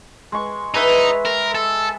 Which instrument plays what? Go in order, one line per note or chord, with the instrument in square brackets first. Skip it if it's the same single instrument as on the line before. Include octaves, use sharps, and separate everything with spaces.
[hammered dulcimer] G#3 C#6
[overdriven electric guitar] D#4 [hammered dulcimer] G#4 B4 E5
[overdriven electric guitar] A#4
A4